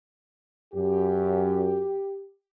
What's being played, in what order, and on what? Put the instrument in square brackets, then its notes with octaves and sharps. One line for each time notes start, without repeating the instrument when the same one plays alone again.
[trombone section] F#2 [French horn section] G4